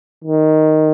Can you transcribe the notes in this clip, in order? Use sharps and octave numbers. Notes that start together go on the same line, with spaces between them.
D#3